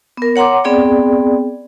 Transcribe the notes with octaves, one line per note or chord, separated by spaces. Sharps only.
B3 A#4
C#5 F#5 A#5 C6 D6
B3 C4 G#4 D5 G5